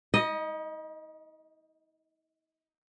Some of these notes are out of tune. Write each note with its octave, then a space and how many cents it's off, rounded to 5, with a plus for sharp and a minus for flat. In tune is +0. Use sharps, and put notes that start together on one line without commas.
D#4 +45 D#5 +0